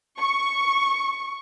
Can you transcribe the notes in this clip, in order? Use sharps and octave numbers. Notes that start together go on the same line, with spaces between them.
C#6